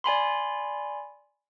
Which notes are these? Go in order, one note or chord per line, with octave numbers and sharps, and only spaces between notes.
D5 G#5 B5 C6